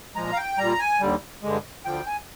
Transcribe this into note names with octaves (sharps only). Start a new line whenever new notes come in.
A#2 F3 G#3 A#5
F5
G5
A#2 G3 A#5
G#5
D#2 D3 G3
G2 D3 G#3
D2 D3 F3 G5
G#5